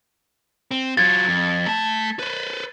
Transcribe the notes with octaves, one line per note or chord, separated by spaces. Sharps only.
C4
F#3 F4 G#6 A6
F2
A3 A5
B4 C5